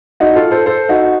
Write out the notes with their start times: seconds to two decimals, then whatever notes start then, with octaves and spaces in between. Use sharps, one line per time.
0.20 D#4 F#4
0.35 F4 A4
0.51 A4 C5
0.66 A4 C5
0.89 D#4 F#4